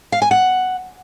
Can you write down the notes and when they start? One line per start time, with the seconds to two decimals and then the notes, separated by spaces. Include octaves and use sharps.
0.12 F5
0.22 G#5
0.31 F#5